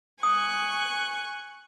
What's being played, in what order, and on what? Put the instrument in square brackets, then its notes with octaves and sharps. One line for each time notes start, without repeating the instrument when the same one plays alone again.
[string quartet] G#5 C#6 F#6 [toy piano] D#6